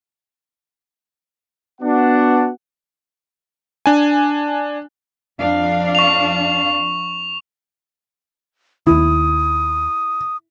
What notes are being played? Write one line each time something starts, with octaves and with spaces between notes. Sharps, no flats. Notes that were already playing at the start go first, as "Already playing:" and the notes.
B3 D4 F#4 F#5
D4 G#5
F2 D4 F5
C#6 F7
D#2 D#3 E4 D#6